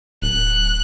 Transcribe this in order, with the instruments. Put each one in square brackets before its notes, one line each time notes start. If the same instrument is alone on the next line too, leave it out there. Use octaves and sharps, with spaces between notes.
[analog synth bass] D1 [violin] F#6